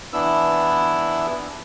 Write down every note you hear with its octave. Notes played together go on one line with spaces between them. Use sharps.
E3 B3 D4 E4 E6